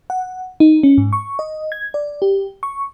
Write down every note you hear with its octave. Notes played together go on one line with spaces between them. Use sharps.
F#5
D#4
C#4
G#2
C#6
D#5
G#6
D5
G4
C#6